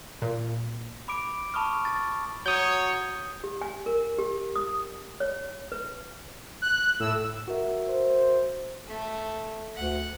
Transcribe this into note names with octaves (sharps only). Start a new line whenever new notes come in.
A#2
B5 D6 D7
A5 B5 C#6 D#6 F6
A6
F#3 C#5 D#6 G6
G4
G#5
A#4
G4
D#6
C#5
B4
F#6
A2 E6
F#4 A#4 E5
C5
A3
D2 F#5